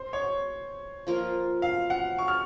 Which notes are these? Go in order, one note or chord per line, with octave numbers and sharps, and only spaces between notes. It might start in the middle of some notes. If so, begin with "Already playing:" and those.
Already playing: C5
C#5
F3 A#3 F4 A#4
F5
F#5
C#6
F6